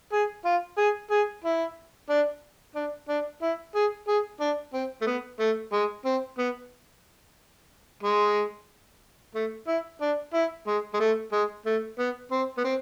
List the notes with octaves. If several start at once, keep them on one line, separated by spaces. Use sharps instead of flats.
G#4
F4
G#4
G#4
E4
D4
D4
D4
E4
G#4
G#4
D4
C4
A3
B3
A3
G#3
C4
B3
G#3
A3
E4
D4
E4
G#3
G#3
A3
G#3
A3
B3
C4
B3
C4